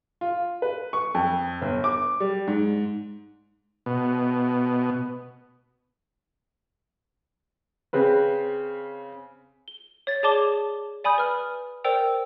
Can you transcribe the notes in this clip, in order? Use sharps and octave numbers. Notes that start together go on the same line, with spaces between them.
F4
B4
C#6
F2
G1
D6
G3
G#2
B2
C#3 C4 B4
G7
C#5 A6
G#4 C#5 D5 A5 D6 G7
D5 G#5 B5 D#6 G6
B4 F6
A#4 C5 D5 G5 E6 F7